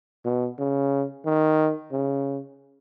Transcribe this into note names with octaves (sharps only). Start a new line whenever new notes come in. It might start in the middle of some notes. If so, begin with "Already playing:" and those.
B2
C#3
D#3
C#3